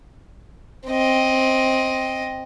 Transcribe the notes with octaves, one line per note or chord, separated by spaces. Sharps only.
C4 D#5